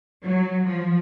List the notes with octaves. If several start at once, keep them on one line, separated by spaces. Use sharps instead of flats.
F#3
F3